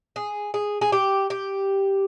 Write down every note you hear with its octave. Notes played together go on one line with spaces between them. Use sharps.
G#4
G#4
G#4
G4
G4